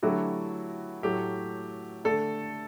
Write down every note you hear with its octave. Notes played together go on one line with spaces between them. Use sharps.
D3 F#3 A3 E4 F#4 G4
A2 F#3 A3 G4
D3 A3 D4 A4